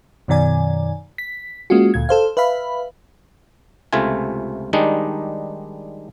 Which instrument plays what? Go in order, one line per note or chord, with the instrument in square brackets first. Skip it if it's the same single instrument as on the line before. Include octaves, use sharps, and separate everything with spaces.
[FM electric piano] F#2 B2 D#3 D5 G#5
B6
G#3 A#3 C#4 F4 F#4
D2 A#2 G#6
A4 C5 F5
B4 E5 F5 B5
[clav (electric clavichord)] C#2 C3 A3 F4 G#5
D#3 G3 G#3 D4 D#4